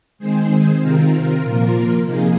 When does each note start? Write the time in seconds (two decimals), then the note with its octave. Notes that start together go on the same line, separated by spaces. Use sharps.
0.19 D#3 G#3 C4 G#4 C5
0.80 C3 D#3 C4 F4 A#4
1.42 A#2 F3 A#3
2.05 C3 F3 A#3 D#4 G#4